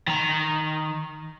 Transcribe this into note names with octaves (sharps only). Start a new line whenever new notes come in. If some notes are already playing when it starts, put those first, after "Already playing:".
D#3 A#5